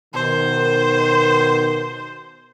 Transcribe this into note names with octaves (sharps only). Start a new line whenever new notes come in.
B2 D#3 C5